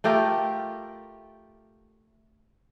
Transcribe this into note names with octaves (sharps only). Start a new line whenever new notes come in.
A3 F4 G4 A#4